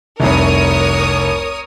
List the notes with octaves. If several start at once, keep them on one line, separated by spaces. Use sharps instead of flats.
F1 C2 A#4 C#5 D#6